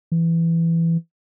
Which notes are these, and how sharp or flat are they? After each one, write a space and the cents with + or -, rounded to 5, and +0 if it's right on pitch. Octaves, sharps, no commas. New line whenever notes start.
E3 +10